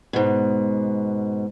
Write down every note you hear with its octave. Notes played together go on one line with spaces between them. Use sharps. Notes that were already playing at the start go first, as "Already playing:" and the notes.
G#2 B2